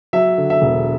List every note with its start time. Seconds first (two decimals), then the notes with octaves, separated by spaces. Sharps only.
0.13 F#3 E5
0.38 D3
0.50 E5
0.62 E1